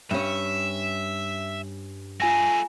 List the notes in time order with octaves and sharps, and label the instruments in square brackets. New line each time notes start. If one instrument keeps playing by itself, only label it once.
[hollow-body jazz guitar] G2 C#4 [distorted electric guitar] E5
[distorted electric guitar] A3 G#4 [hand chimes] F4 G#5 A#6